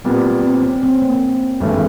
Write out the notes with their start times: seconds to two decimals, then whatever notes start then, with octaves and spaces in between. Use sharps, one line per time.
0.05 A#2 G3 B3 C4
0.44 C4
0.62 C#4
0.83 C4
1.02 A#3
1.60 G#1 G2 E3 G#3 A3 C4